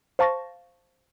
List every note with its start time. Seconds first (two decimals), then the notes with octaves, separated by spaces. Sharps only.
0.19 C5 F5 A5 C#6 A6 A#6